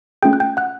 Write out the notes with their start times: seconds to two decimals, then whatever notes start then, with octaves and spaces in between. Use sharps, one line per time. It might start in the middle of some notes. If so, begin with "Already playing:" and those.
0.23 A3 C#4 F4 G#4 G5 G6
0.33 F#6
0.40 G5 G6
0.57 F#5 F#6